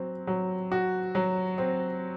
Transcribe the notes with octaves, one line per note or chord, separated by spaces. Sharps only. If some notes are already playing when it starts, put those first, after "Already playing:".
Already playing: F#3 C4
F#3
F#4
F#3
C4